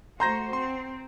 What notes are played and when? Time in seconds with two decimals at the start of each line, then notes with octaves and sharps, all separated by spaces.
0.20 A3 F#4 C5 A#5 C6 G6 A#6
0.53 C4 C6